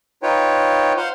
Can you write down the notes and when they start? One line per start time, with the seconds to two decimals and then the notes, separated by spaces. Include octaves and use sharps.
0.23 D#4 F4 B4 C#5 G5
0.97 C5 F5 F#5 C6